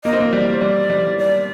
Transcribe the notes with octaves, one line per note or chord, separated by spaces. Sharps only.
A#3 D#5
C4
A#3
G3 D5
C5
G3 D5
G3
D5